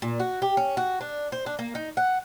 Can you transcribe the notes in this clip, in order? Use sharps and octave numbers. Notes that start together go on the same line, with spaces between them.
A#2
F#4
G4
C#4
F#4
D4
C5
D4
A#3
D#4
F#5